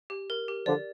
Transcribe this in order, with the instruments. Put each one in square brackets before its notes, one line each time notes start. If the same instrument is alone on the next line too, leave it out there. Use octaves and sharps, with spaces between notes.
[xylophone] G4
A#4
G4
[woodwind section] D3 F3 [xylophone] D5